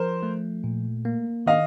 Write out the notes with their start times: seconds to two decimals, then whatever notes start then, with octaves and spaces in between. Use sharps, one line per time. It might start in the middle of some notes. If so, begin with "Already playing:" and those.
Already playing: F3 A#4 C5
0.23 A3
0.64 A#2
1.05 A#3
1.46 D#3 D#5 F5